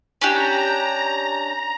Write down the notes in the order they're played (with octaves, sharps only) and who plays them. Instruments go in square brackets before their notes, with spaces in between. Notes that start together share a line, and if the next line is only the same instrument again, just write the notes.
[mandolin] C#4 D4 G4 [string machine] A#5